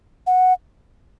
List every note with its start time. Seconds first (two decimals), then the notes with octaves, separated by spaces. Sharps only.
0.27 F#5